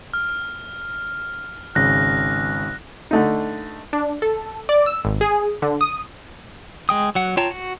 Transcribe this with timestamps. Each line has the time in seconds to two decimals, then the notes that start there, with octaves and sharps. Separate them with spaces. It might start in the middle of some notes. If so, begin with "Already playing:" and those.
0.14 F6
1.75 G#1 C#3 F#6 A#6
3.11 D3 A3 D#4
3.93 D4
4.22 A4
4.69 D5
4.86 E6
5.05 G#1
5.21 G#4
5.62 D3
5.81 D#6
6.89 G#3 G5 D#6
7.15 F#3 F#5
7.37 F4 C#5 G5 A5 A#5
7.51 F#4